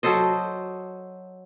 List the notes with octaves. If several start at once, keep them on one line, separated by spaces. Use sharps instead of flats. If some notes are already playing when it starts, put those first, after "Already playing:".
F#3 A4 C5 D#5